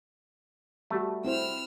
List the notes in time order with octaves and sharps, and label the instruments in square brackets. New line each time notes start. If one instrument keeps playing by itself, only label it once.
[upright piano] G3 F#4 [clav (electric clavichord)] A3
[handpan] C4 E4 C5 [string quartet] E6 F6